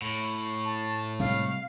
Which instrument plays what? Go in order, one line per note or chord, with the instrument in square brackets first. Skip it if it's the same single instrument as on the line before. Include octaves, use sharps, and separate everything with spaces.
[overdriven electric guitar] A2
[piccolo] A5
[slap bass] C3 G3 G#3 [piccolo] F5